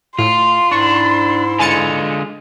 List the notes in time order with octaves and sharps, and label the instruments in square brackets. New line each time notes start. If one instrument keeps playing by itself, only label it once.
[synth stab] A2 [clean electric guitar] F4 [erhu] C6
[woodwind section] G#2 E4 [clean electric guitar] D4 [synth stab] C#6
[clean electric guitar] D3 G#3 F4 [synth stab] G#5 A6 C#7